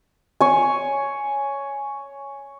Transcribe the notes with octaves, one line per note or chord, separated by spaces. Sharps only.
C#5 G#5